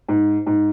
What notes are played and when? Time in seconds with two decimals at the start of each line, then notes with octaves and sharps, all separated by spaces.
0.08 G#2
0.46 G#2